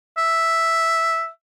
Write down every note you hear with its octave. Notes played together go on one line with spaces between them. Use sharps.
E5